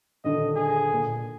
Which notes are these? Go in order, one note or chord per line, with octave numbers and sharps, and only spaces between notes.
D#1 D3 D#5
G#4
A#2